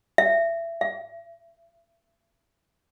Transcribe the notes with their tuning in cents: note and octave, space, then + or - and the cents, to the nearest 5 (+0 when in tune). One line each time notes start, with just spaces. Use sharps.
E5 +25
E5 +40